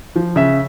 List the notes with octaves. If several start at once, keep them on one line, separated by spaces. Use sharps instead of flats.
F3
C#3 E5